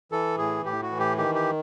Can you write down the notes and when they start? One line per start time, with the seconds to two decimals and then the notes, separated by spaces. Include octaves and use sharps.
0.12 E3 A4
0.38 A2 G#4
0.64 A2 G4
0.82 F#4
0.91 E3
0.99 G4
1.18 D#3 G4
1.35 G4